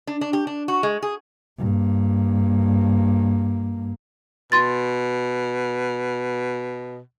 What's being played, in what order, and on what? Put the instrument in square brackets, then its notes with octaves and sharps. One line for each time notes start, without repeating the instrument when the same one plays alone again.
[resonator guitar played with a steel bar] D4
D4
G4
D4
F#4
G#3
G#4
[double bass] G2 A#3
[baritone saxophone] B2 [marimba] C6 A6